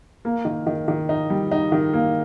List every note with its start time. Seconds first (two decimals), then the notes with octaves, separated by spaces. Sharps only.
0.25 A#3
0.45 D#3
0.67 D#3
0.88 D#3
1.09 D#4
1.30 G3
1.52 D#4
1.72 D#3
1.94 A#3